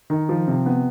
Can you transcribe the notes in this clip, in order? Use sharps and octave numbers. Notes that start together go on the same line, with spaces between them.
D#3
F3
C3
B3